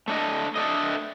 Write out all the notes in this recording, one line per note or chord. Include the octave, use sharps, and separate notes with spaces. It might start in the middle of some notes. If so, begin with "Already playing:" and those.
A3 D4 A4 D#5
A3 D4 A4 D#5